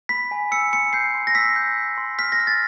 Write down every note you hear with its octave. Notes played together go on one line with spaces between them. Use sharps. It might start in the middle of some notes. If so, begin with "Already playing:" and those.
B5 B6
G#5
E6 C#7
C6 C#7
G6 C7
C6
A#6
E6 B6
G6
G6
C6
F6 B6
A#6
F6
A6